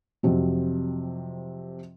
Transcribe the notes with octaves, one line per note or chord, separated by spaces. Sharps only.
F2 C3 F#3